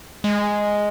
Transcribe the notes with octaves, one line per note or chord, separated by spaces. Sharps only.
G#3